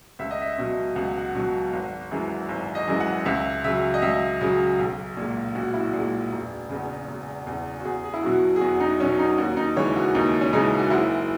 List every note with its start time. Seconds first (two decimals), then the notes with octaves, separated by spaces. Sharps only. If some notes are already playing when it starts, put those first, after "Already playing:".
0.19 C#2 E5
0.31 D#5
0.41 E5
0.52 E5
0.58 B2 F#3 D#5
0.96 C#2 F#5
1.18 F#5
1.35 B2 F#3
1.73 G#1
2.11 F#2 E3 G#3
2.49 G#1
2.75 D#5
2.88 F#2 E3 G#3
3.00 F#5
3.25 C#2 E5
3.64 C#3 F#3 E5
3.94 D#5
4.02 C#2 E5
4.41 C#3 F#3
4.79 B1
5.17 A#2 G#3
5.55 B1 F#4
5.74 E4
5.80 F#4
5.93 A#2
5.98 G#3
6.32 E1
6.69 E2 C#3
7.08 E1
7.47 E2 C#3
7.80 F#4
7.85 E2 G#4
8.04 G#4
8.14 E4
8.23 B2 F#3 F#4
8.56 G#4
8.61 E2 F#4
8.80 D#4
9.00 B2 F#3 C#4
9.19 D#4
9.38 D#2 F#4
9.57 D#4
9.76 C#3 E3 G#3 C#5
9.96 F#4
10.14 D#2 D#4
10.41 C#4
10.53 C#3 E3 G#3 D#4
10.79 F#4
10.90 F#1 E4